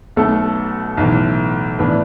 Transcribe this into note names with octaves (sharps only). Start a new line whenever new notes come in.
B1 B2 A3 A4
B1 A2 E3
A2 E3 B3 D4 B4